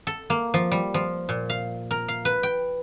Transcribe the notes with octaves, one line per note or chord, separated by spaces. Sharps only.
A4
A#3
F3
G3
F3
A#2
F5
A#4
F5
B4
G5